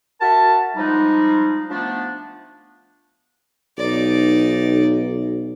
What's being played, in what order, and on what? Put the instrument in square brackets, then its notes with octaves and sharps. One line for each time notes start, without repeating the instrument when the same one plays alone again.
[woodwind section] F#4 A#4 E5 A5
F3 G3 G#3 D#4
F3 A3 B3 D4
[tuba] B1 [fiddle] D#4 D5